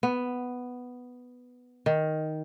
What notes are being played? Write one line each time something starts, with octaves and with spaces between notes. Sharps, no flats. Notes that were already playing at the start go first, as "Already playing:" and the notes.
B3
D#3